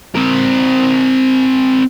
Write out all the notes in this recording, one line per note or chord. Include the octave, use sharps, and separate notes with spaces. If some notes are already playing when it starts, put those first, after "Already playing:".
C4 A#4